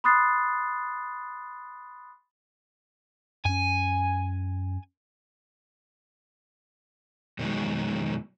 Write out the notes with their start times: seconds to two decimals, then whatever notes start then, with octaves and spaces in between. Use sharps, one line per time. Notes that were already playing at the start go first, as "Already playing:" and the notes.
0.04 B5 C6 D#6 F#6 A6 C7
3.45 F#2 C#4 G#5
7.39 F2 B2 D#3 E3 F#3 G#3